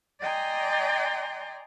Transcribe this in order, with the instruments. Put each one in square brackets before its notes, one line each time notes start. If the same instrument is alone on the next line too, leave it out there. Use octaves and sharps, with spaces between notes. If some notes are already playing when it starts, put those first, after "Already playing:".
[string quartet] D5 D#5 G5 G#5 A#5 C6